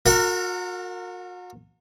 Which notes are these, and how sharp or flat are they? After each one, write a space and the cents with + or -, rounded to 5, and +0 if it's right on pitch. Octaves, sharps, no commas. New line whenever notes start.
F#4 -40 A#4 -30 F#5 +0